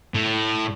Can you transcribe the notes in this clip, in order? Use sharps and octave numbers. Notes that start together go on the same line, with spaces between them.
A2